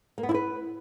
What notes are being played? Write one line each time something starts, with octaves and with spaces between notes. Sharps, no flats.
A#3
B3
E4
B4